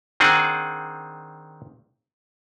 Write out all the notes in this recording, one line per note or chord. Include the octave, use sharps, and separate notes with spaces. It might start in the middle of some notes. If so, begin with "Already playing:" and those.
D#3 C4 D4 G#4 F#5